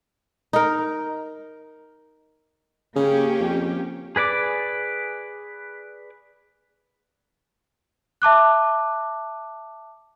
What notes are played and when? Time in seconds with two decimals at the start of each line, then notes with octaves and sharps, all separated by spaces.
0.53 D#4 A#4
2.96 C#3 A#3 C#4 G4
3.40 F2
4.16 G#4 B4 D5 D6
8.22 E5 A5 D6 F#6